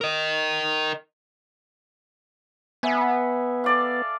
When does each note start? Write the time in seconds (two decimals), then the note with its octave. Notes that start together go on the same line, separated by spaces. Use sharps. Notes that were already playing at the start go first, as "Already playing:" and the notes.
0.01 A#4 D#5
2.83 B3 E5 G#5
3.64 A4 D5 F5